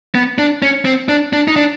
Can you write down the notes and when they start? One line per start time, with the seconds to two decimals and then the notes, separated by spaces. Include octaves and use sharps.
0.15 B3
0.38 D4
0.62 C#4
0.85 C4
1.08 D4
1.33 D4
1.48 D#4
1.56 D4